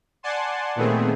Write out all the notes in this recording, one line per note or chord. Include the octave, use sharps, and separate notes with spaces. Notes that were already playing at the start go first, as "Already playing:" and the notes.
D5 F#5 G#5 A5 C6
A#2 D#3 A3 B3 C4 G#4